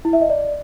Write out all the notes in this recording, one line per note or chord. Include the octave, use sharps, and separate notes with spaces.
E4
E5
D#5
D5